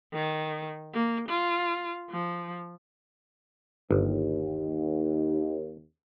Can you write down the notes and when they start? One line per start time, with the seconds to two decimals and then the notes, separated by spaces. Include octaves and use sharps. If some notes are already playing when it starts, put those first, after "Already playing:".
0.13 D#3
0.94 A#3
1.28 F4
2.11 F3
3.91 G1 D#2